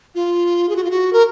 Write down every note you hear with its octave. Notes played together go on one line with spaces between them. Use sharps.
F4
G#4
F#4
F4
F#4
A#4